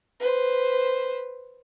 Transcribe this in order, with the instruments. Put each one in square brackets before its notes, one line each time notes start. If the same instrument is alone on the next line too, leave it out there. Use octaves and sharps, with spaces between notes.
[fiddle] B4 C5